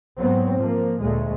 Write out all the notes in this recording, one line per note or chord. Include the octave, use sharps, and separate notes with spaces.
G#2 F#3 B3 C4
F3 A#3
D2 A#2 G#3 A3